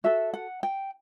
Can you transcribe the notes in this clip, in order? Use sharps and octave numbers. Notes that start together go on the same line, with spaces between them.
F#4 A4 E5
F#5
G5